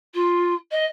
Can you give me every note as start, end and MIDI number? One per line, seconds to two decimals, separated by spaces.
0.14 0.54 65
0.71 0.85 75